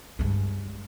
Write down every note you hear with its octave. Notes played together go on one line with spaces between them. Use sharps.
G2 G#3